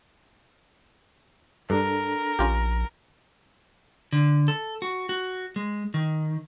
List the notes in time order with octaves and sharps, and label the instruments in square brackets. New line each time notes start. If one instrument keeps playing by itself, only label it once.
[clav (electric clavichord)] G2 [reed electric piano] D4 A4 [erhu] A#4
[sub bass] A#1 [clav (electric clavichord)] C#4 F4 G4
[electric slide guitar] D3
A4
F#4
F#4
G#3
D#3